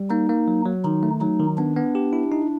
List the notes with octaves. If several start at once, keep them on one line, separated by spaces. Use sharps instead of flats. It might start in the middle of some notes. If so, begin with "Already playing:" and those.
Already playing: G3
A#3 D#4
A#3
F#3
F#3
D#3 D#4
A3
F#3 D#4
D#3
B3 D4
B3
G4
E4
D#4